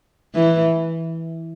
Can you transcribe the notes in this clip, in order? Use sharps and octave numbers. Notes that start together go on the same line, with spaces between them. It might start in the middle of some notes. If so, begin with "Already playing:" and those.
E3